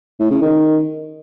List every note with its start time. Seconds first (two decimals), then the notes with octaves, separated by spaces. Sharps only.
0.20 A2
0.31 C#3
0.42 D#3